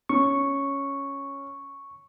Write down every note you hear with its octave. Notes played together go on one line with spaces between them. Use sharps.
C#4 C#6